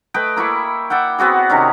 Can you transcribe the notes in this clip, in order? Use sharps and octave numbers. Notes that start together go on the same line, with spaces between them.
A3 B4 D#5 G5
A#3 E4 B5 C#6
D5 E5 F#5 G5
B3 C4 F#4 G#4
C3 D#3 C#4